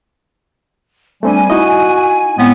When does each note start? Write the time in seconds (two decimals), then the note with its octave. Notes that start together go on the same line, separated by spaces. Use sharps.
1.23 G3 A3 C4 D4 G#5
1.50 D#4 E4 F#4 D#5
2.38 A2 G#3 B3 C4